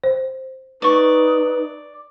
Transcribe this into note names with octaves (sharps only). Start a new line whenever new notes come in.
C5
D#4 B4 D5 C#6